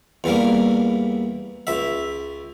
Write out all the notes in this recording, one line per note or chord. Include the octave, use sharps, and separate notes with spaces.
E2 E3 G3 A#3
C#2 E5